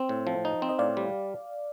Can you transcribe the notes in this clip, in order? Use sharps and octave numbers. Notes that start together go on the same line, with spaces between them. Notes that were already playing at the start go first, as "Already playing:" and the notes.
Already playing: C4 G5
A2
F3
D#4
C4
D#5
A2 D5 F5
G3